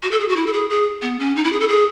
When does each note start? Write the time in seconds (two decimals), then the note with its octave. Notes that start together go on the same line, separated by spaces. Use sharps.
0.03 F#4
0.11 A4
0.20 G#4
0.28 F#4
0.36 E4
0.46 A4
0.53 G#4
0.70 G#4
1.02 B3
1.19 C#4
1.36 D#4
1.44 E4
1.52 G#4
1.60 A4
1.68 G#4